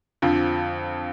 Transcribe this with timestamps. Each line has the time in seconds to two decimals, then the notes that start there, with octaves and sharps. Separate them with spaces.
0.22 F2 D3 F3